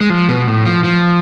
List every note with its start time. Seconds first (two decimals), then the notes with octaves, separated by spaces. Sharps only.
0.01 G#3
0.10 F3
0.29 B2
0.47 A2
0.65 F3
0.84 F3